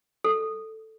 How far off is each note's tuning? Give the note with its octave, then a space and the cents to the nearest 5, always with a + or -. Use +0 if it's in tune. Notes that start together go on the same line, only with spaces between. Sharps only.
A4 +5